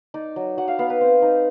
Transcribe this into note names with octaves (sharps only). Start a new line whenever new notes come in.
D#4 D5
F#3
F#3 F#5
F5
B3 F5
B4
C4
D#4